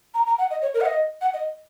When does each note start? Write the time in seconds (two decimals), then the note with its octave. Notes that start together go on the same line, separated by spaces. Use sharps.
0.14 A#5
0.26 A#5
0.38 F#5
0.50 D#5
0.62 C#5
0.74 A#4
0.81 F#5
0.86 D#5
1.21 F#5
1.34 D#5